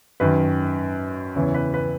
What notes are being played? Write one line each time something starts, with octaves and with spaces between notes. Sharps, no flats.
F#2 D#3 B4
E2 C#3 E3 C#5
B4
B4